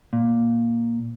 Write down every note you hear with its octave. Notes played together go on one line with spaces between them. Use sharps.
A#2